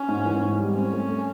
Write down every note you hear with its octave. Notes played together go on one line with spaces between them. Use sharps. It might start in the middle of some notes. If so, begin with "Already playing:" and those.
Already playing: C#4
G#2
E3
G#2
G3
C4 C#4
A3
A3